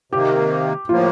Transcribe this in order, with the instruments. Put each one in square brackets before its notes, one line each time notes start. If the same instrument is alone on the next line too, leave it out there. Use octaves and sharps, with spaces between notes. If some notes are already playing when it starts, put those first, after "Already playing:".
[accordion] C3 D#3 A#3 [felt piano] G4
[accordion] A2 F3 A#3 [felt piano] F4